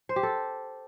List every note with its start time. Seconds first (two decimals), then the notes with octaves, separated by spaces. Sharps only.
0.09 C5
0.16 G4
0.23 A4